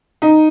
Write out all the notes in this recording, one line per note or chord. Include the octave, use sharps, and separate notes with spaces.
D#4